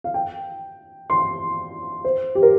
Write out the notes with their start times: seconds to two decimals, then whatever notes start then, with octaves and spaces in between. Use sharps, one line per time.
0.04 F5
0.14 G5
1.10 C6
2.05 C5
2.35 G4
2.42 A#4